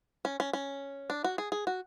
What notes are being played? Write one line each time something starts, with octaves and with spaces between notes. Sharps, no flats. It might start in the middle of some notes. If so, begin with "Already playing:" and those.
C#4
C#4
C#4
D4
F#4
G#4
G#4
F#4